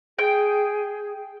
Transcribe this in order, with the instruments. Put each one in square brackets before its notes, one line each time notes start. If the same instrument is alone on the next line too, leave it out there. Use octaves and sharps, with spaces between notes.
[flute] G#4 [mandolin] G5